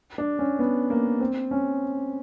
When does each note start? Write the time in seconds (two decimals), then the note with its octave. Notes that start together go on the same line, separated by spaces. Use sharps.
0.18 D4
0.39 C#4
0.59 B3
0.90 A#3
1.21 C4
1.51 C#4